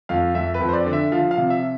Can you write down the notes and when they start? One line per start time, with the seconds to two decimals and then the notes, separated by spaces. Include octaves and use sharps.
0.09 F2 F5
0.35 F2 E5
0.54 B4
0.60 F2
0.69 C5
0.73 D5
0.86 D3
0.93 E5
1.12 F3 F5
1.31 F5
1.37 C3
1.50 E5